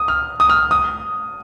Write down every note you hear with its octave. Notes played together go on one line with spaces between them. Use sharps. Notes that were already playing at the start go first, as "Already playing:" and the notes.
Already playing: D#6
F6
D#6
F6
D#6